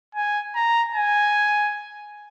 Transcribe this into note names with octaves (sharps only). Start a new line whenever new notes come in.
G#5
A#5
G#5